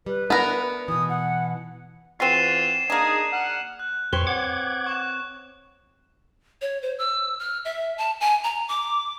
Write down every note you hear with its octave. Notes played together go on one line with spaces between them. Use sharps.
G3 B4
B3 D4 E4 A#4
B2 E3 D#6
F#5
E2 E3 C4 F4 F#4 C7 D#7 E7
A#3 D4 D#4 G#4
F#5 F6
F#6
F2 C4 B4 C#5 C6
F#5 D6 G#6
C#6 F#6 E7
C#5
C5
E6
F6
E5
A5
G#5
A#5
D6